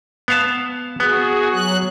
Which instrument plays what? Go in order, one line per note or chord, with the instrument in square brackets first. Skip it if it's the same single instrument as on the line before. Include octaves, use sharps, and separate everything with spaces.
[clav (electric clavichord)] B3 F5 A5
[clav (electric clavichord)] B3 [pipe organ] F#4 G#4
[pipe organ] F#3 F#6